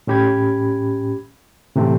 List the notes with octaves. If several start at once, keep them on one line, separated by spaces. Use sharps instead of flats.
A2 C#4 G4 B5 G#6
A2 C3 E3 A3 C4